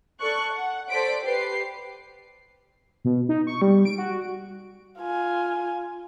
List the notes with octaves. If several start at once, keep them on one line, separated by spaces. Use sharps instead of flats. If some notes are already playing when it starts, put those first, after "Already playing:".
A4 D5 C#6 F#6
F#5
A4 C5 D5 B6 D7
G4 B4 C7
B2
D#4
C#6
G3
D7
F#4
F4 G#5